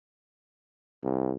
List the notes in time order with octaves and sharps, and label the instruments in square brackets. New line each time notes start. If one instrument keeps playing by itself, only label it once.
[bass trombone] C2